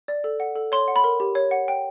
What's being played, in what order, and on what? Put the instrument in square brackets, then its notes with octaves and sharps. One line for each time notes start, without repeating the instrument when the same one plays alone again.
[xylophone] D5
A4
F#5
A4
C#5 C6
F#5
B5
A#4
G4
C#5
F#5
G5